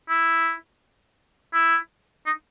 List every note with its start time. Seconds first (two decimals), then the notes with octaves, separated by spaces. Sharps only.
0.09 E4
1.54 E4
2.26 D#4